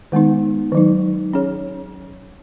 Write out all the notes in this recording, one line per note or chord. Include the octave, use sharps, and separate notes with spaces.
D#3 G#3 B3 D#4
D#3 F#3 D#4
C#4 G#4 C#5